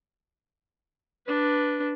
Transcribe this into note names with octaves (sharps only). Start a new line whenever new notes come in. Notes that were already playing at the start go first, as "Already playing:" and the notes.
D4 B4